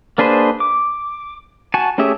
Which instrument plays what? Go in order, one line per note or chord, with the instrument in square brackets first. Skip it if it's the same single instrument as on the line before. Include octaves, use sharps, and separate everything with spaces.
[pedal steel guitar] A#3 D4 G#4 B4 C5
D6
F#4 G#5 A5
A3 C#4 G4 G#4 E5